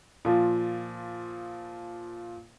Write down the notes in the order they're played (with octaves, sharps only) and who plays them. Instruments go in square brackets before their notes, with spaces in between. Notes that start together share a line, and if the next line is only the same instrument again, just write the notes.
[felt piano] A#2 F3